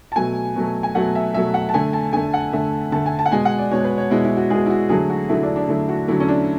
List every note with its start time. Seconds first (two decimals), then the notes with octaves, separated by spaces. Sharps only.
0.12 A5
0.16 B2 F#3 A3 G#5
0.55 B2 F#3 A3
0.83 G#5
0.95 B2 F#3 A3 F#5
1.15 E5
1.34 B2 F#3 A3 E5
1.54 F#5
1.69 A5
1.74 D3 A3 G#5
1.93 A5
2.13 D3 A3 G#5
2.34 F#5
2.53 D3 A3 E5
2.92 D3 A3 A5
3.06 G#5
3.19 A5
3.26 F#5
3.32 B2 G#3 G#5
3.45 F#5
3.58 D5
3.71 B2 G#3 C#5
3.85 B4
3.98 C#5
4.10 B2 G#3 E4
4.25 E4
4.37 F#4
4.50 B2 G#3 G#4
4.66 E4
4.70 F#4
4.89 D3 F#3 A3 G#4
5.10 F#4
5.29 D3 F#3 A3 E4
5.43 D4
5.56 D4
5.68 D3 F#3 A3 E4
5.89 F#4
6.08 D3 F#3 A3 E4
6.20 C#4
6.28 D4